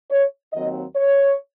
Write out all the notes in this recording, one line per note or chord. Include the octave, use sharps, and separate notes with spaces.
C#5
D#2 D#3 F#3 C4 D#5
C#5